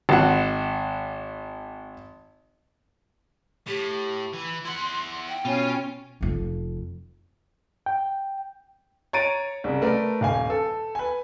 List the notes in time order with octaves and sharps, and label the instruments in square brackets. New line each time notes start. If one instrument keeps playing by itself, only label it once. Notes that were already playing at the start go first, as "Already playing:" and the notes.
[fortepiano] G#1 F#5
[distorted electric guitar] A2 [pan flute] G4
[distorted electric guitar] E3
[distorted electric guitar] E4 F#5 [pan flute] C6
[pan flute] G5
[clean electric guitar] B2 [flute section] C#4 [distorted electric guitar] F4
[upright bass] F1 F2
[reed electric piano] G5
[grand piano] C#5 A#5 A6 D7 D#7
C2 C#3
A3 A#4 B4 D5
D#1 F5 G#5
A4
B4 G#5